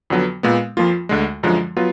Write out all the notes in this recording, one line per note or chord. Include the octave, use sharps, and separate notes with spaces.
F2 D3 F#3 B3
A#2 G#3 B3
F2 F3 A#3 F4
D2 D3 G#3
F#2 D3 F3 G#3
F#3 B3 F4